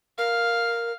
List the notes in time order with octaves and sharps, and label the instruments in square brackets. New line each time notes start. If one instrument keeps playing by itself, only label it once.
[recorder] A#4 [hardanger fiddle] F5